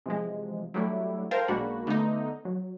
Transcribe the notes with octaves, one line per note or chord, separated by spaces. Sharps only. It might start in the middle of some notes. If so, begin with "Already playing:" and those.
C3 E3 F3 G#3
F#3 G3 A3 D4 E4
A4 A#4 C5 F5 G5 A5
B1 G#3 A#3 D4 F#4 B5
D3 A3 B3 D#4
F#3